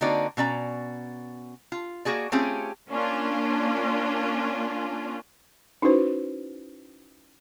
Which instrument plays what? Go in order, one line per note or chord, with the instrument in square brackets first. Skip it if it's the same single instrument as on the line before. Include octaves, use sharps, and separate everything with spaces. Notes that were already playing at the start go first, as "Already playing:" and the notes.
[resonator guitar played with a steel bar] D3 A#3 C4 D#4 F#4 D5
B2 C#4 D5 A#5
F4
A#3 F#4 G#4 D5
A3 C4 C#4 F4 G4 G#4
[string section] A#3 C#4 D4 F4
[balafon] C#4 D#4 E4 F#4 B4 C5